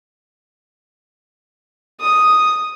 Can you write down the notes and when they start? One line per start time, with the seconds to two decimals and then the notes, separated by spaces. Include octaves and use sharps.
2.01 D#6